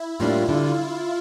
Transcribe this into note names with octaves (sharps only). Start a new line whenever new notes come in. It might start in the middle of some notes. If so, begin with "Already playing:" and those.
Already playing: E4
A2 G3 A#3 D4 F4
D3 G3 D4